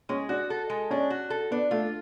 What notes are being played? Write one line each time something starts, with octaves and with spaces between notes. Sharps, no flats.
G#3 C#4
D4 F#4
A4
G#3
C#4 D4
F#4
A4
B3 D4
A3 F4